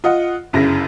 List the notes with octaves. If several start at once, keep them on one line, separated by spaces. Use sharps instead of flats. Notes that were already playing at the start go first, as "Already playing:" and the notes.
F4 D#5 F#5
G1 F#2 C#3 E4 A#6